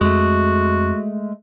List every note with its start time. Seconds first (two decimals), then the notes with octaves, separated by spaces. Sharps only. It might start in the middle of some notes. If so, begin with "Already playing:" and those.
0.01 F2 G#3 A3 F#4